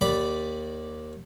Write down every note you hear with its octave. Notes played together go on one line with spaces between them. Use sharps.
D#2 D5 B5 D6